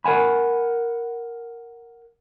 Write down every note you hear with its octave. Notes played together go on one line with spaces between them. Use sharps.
A#4 F#5 G#5 B5